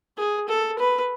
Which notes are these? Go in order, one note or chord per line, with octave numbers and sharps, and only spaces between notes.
G#4
A4
B4